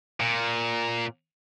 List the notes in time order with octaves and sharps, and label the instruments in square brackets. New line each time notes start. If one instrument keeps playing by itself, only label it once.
[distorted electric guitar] A#2